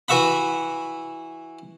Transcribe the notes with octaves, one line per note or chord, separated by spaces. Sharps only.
E3 F#4 E5 F#5 B5